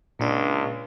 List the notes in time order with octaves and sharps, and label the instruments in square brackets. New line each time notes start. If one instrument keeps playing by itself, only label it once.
[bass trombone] C#2 [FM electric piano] A#2 D4